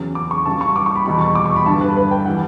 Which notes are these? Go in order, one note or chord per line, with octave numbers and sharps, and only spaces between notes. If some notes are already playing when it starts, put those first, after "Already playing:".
Already playing: E2 C#3 F#3
D6
C#6
C#2 C#3 G3 A5
C#6
D6
C#6
B5
E2 B2 G3 B5
C#6
D6
C#6
B5
G2 D3 G3 A5
B4
B4
G5
E3 G3 F#5